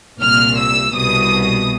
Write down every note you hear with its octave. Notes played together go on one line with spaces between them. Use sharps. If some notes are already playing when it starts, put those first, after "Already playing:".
C2 A#2 F6
E6
C2 B2 D#6